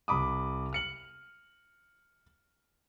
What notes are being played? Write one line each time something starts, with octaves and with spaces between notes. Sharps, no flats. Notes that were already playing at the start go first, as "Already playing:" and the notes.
C2 B5 D6 D#6
F6 C#7 F#7